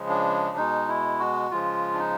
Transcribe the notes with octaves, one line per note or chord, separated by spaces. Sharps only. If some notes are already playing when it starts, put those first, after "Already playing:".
Already playing: C#3 F3 G#3
D4
B2 G#3 D#4
E4
F#4
C#3 F3 G#3 F4
D4
D#4